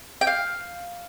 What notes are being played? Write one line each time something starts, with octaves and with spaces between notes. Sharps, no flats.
G5
F5